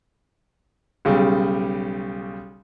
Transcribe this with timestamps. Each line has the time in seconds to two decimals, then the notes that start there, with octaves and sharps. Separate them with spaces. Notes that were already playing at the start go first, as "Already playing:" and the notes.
1.05 B1 C#3 G3